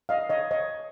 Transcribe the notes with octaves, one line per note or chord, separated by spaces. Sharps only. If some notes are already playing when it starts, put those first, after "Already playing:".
D#5 F5
C#5 D#5
C#5 D#5